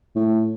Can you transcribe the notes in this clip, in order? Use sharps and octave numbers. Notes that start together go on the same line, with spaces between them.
A2